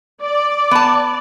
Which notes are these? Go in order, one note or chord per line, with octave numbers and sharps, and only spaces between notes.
D5
B3 A5